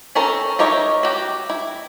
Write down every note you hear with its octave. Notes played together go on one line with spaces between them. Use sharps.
C4 C#4 A4 A#4
D#4 G4 A#4 C#5 E5
F#4 G4
E4